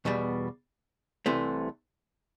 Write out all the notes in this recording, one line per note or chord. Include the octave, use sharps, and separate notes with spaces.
E2 B2 G3 B3
C2 C3 E3 A3